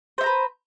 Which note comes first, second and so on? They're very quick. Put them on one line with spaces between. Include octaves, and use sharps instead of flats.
C5 E5 A#5 B4